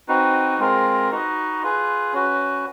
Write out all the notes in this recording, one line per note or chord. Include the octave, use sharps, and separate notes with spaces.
C4 D#4 F#4 B4
G#3 C4 F4 A#4
D#4 F#4 B4 D#5
F4 G#4 B4
C#4 F#4 B4